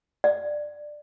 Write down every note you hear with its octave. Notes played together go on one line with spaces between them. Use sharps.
D5